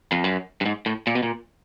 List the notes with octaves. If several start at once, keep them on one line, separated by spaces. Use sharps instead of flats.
F2
F#2
G2
G#2
A2
A#2
B2
A#2